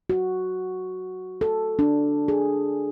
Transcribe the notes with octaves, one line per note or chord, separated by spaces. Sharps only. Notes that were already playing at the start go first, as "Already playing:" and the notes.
F#4
A4
D4
G#4